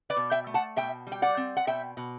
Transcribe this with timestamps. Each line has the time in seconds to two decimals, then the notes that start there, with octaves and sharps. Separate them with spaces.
0.10 B4 D5
0.17 B2
0.31 E5 G5
0.47 A3
0.54 F#5 A5
0.76 B2 E5 G5
1.07 G3
1.12 G5
1.22 D5 F#5
1.37 C4
1.57 F#5
1.67 B2 E5 G5
1.97 B2